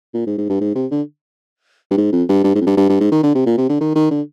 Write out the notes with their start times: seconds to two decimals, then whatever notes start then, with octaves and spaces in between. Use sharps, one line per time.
0.14 A#2
0.27 G#2
0.38 G#2
0.50 G2
0.61 G#2
0.75 C3
0.91 D3
1.91 G2
1.98 G#2
2.12 F2
2.29 G2
2.44 G2
2.55 G#2
2.61 F2
2.67 G2
2.77 G2
2.89 G2
3.00 G#2
3.12 D#3
3.23 D3
3.35 C3
3.46 A#2
3.58 C3
3.69 D3
3.81 D#3
3.95 D#3
4.11 D3